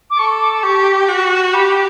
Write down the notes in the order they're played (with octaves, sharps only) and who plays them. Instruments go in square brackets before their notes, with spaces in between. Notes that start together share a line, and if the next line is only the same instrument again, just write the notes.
[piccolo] D6
[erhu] A4 [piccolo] C#6
[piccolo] D6
[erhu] G4 [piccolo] C#6
[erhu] F#4
[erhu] G4 [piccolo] B5